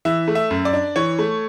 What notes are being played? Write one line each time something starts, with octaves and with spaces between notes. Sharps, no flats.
E3 E5
A3
E5
F#2
D5
D4
E3 C#5
A3